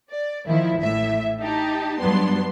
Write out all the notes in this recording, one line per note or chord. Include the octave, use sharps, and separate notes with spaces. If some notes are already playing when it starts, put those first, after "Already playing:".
D5
D#3 F3 E4
A1 A2 E5
D#4 G4 A5
G2 F#3 B3 D4 C6